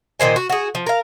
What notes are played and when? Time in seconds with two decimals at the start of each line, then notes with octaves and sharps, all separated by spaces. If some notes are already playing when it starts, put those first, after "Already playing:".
0.20 A#2 D#3 C5 G#5
0.36 F#4
0.50 F#4 G#4
0.75 F3
0.86 A#4 F5